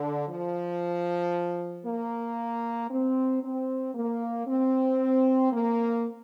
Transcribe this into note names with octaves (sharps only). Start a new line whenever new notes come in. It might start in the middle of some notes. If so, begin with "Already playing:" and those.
Already playing: D3
F3
A#3
C4
C4
A#3
C4
A#3